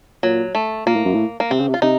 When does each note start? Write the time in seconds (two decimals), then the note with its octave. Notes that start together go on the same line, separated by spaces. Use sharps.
0.23 A#2 F#3
0.55 A3
0.86 A#2 A#3
0.96 A2
1.05 F#2
1.14 A2
1.40 A#3
1.51 C3 C4
1.60 C#3
1.69 C3
1.74 F4
1.82 C3 D#4